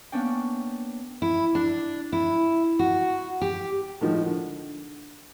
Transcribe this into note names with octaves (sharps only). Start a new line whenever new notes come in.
A#3 B3 C#4 D4 G5
E4
D4
E4
F#4
G4
A2 D3 D#3 F3 G#3
D3